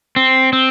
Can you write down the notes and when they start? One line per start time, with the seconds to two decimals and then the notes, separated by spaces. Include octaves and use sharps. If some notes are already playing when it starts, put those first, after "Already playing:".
0.16 C4
0.53 C4